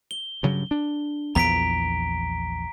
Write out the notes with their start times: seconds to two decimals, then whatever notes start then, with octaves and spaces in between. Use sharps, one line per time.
0.11 G7
0.43 G2 C#3 F#3
0.71 D4
1.35 A#1 E2 B3 A#5 B6 D7